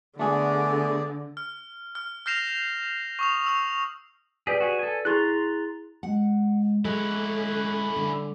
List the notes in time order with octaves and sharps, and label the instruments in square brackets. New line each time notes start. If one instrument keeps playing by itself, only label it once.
[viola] D3 [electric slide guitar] A3 G#4 [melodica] B3 D4 D5
[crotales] F6
F6
F6 G6 A#6 C7 E7 F7
C#6 D#6 F7
E6 F7
[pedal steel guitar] G4 G#4 [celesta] B4 D5 B6
[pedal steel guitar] F#4 G#4
A4 G#5
[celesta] E4 G#4 A6 [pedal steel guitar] A#5 C6 F#6
[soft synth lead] G#3 [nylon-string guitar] F#5
[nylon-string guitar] G#3 [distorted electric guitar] C#4 E4 [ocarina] A4 [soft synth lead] F#6
[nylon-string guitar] D3 [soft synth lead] G3